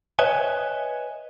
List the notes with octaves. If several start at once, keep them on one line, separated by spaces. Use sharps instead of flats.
B4 C#5 D#5 E5 G#5